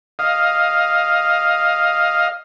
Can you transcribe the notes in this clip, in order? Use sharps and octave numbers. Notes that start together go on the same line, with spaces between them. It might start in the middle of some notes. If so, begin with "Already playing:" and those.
D#5 F5